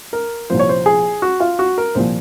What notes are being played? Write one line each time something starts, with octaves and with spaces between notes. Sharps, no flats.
A#4
C2 A#2 F3 C5
C#5
C5
G#4
F#4
F4
F#4
A#4
C2 A#2 F3 C5